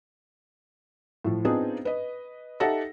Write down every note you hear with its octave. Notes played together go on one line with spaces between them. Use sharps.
A2 F3
B3 C4 D4 D#4 F4 G#4
B4 D#5
D#4 G4 A4 E5 F#5 A#6